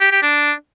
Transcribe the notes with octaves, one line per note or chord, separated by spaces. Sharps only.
G4
G4
D4